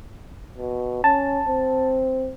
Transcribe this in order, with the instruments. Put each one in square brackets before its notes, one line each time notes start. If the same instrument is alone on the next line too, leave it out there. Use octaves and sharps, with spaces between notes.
[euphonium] B2
[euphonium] C#4 [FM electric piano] A5
[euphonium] C4